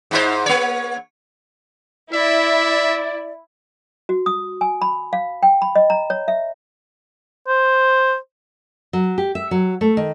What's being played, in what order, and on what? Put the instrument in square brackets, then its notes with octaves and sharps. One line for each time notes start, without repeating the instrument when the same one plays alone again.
[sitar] G#2 D#4 C5
A#3 C#5
[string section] E4 [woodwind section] D5 [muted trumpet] E5
[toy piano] F#4
D#6
G#5
B5
F5
G5
B5
D#5
A#5
C#5
E5
[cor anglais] C5
[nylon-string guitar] F#3
G4
E5
F#3
A3
D#3